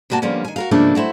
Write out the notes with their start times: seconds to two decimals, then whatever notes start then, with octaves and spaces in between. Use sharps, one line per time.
0.10 C3 G3 A#3 F#4 A5
0.22 D3 F3 G3 A#3 B3 C#4
0.45 D#3 G#5
0.56 F#4 A#4 F5
0.71 G#2 C#3 F3 A3 A#3 D4
0.95 F#3 A3 E4 C5